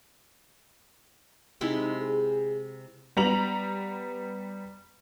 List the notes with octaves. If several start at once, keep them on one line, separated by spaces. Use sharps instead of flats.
C3 G#3 D#4 E4
G#4
G3 B3 A#5 F7 F#7